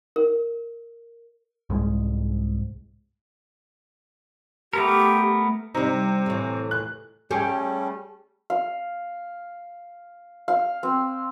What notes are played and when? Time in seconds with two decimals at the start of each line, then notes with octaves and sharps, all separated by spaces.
0.16 A#4
1.70 C2 G#2 G#3
4.73 A3 B3 G4 A#4
5.75 C3 G3 D#4
6.26 A2 E3
6.71 F#6
7.31 G3 A3 C#4 G4 G#4 C#5
8.50 F5
10.48 F5
10.83 C4